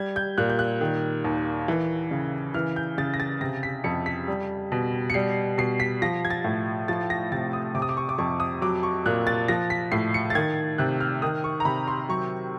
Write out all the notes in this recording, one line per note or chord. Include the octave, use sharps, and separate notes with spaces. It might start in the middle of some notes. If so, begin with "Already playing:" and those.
Already playing: G3 G#6
G6
A#2 F#6
G6
F#6
D#3
D#2
E3
C#3
E3 F6
G6
C#3 A6
A#6
A6
C3 A#6
B6
F2 C#7
B6
G3
B2
C#7
G3 C7
B2 C7
B6
F3 A#6
G#6
A6
A2
F3 A6
A#6
C3 A6
D#6
C3 D6
D#6
D6
C#6
D6
F2 C#6
D#6
F#3 D6
C#6
A#2 F#6
A6
F3 A#6
B6
A2 C7
C#7
A6
D#3 G#6
C3 F#6
F6
D#3 D#6
C#6
A#5
C3 B5
C6
F#3 C#6